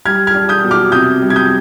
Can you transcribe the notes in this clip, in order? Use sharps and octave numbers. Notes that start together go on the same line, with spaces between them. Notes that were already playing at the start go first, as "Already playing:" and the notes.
G3 F6 G#6
F6 G#6
D4
D#6 G6
B2
D6 F6
C3 D#6 G6
G3
G#6
D#6 G6